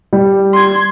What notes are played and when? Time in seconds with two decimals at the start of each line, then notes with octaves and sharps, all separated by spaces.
0.13 G3
0.53 C6 G#6